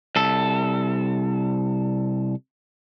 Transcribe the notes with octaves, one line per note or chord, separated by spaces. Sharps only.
C2 A4